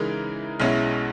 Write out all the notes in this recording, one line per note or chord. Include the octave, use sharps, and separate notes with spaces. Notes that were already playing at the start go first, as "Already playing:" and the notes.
Already playing: C#3 E3 G#3 D#4 A#4
B1 B2 G#3 C#4 E4